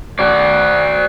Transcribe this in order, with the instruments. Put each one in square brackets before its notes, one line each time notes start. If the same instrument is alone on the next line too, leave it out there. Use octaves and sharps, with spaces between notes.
[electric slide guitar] F#4 D5